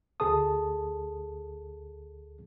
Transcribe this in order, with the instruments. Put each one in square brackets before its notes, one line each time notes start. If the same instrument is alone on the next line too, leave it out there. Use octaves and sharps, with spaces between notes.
[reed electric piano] D2 G#4 A4 A5 D#6